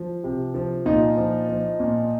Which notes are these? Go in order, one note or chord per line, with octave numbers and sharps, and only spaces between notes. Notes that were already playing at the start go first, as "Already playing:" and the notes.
Already playing: F3
C3
F3
A#2 D#4 F4
F3
F3
A#2